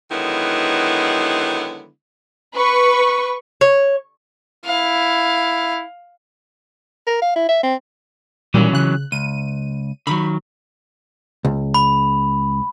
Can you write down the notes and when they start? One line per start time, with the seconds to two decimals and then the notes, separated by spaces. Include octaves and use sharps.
0.11 D3 D#3 F#3 G#3 B3 E4
2.56 B4 C#6
3.61 C#5
4.66 E4 F5
7.07 A#4
7.22 F5
7.36 E4
7.49 E5
7.63 C4
8.54 A#2 D#3 E3 F#3 G3 C#4
8.73 C#3 F#6
9.12 C#2 D#7
10.07 D3 D#3 F#3 B5
11.45 C#2
11.74 B5